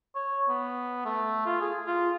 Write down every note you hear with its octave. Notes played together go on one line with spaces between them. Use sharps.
C#5
B3
A3
F4
G#4
F4